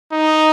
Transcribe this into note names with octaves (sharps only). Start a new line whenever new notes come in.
D#4